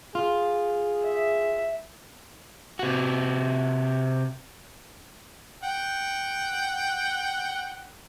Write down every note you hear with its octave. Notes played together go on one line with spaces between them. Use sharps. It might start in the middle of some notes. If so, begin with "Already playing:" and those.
F4 G#4
E5
C3 F#4
F#5 G5